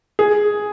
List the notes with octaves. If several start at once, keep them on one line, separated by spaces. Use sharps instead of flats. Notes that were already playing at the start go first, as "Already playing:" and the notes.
G#4